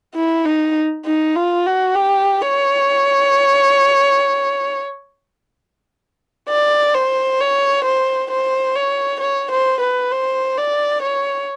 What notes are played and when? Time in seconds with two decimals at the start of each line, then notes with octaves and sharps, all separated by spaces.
0.15 E4
0.45 D#4
1.06 D#4
1.36 F4
1.67 F#4
1.96 G4
2.41 C#5
6.49 D5
6.95 C5
7.41 C#5
7.85 C5
8.31 C5
8.76 C#5
9.21 C#5
9.52 C5
9.81 B4
10.12 C5
10.57 D5
11.03 C#5